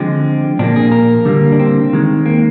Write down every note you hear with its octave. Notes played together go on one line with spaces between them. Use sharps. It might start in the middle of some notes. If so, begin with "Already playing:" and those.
Already playing: D3 F3 G#3 C4
A#2 F3 A#3 D4
G#4
A#4
D3 G3 A#3
D4
C4
D#3 G#3
A#3